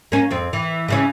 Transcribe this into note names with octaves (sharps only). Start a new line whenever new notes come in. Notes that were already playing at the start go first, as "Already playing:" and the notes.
A#3 C#4
F2 C4
E3
C#3 E3 C#4